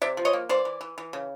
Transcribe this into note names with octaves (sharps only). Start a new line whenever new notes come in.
C3 D5 E5
F3
C#5 D#5
A#3
E3 C5 D5
E3
E3
E3
C#3